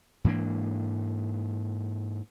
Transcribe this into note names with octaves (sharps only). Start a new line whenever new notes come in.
G#2 E3 A#3 D4